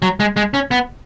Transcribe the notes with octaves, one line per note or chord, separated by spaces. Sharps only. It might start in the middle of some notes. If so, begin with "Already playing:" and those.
F#3
G#3
G#3
C#4
B3